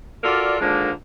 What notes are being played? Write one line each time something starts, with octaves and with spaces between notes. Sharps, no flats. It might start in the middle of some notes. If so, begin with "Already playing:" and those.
F4 F#4 A4 A#4 D5
D3 D#3 F3 G#3 A#3 D4